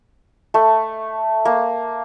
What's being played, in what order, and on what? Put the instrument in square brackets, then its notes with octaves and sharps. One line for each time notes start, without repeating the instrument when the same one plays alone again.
[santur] A3
A#3